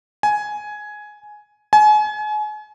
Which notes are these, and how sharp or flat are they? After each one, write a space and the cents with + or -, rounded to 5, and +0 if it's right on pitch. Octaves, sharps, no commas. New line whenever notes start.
G#5 +10
G#5 +35